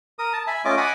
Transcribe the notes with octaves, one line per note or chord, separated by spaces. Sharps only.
A#4 D#6
A5
E5 G#5 B5
A3 C#4 F4 D#5 D6
D#5 F#5 G#5 B5 D6 D#6